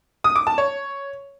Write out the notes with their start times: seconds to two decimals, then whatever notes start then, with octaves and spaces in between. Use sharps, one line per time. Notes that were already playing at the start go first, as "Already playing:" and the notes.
0.24 D#6
0.36 D6
0.47 A5
0.58 C#5